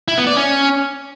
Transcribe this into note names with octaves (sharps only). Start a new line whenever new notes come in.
E4
B3
D5
C#4